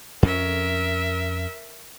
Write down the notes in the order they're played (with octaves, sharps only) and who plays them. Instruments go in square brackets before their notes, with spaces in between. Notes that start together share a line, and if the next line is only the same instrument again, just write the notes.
[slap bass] F2 C#4 [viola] A#4 E5